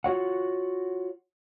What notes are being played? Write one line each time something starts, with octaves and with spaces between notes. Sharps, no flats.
F4 F#4 C#5 F#5